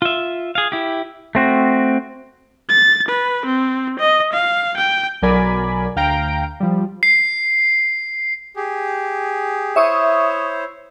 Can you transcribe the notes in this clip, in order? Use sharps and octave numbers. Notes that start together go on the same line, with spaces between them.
F4 E5
G#4 F5
E4 G4
A3 C4 F#4
A6
B4
C4
D#5
F5
G5
B1 F#3 A#4 D5 G#5 B5
D2 F5 G5 A#5 D7
F3 G3
C7
G4 G#4
E4 C5 C#5 E5 C#6 D#6